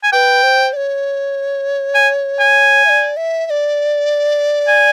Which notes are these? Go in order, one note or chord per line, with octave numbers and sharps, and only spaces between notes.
G#5
B4 G5
C5
D5
C#5
G#5
G#5
E5
D5
E5
E5
D5
G#5